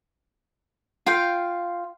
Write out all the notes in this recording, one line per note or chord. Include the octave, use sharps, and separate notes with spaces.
F4 F5 G5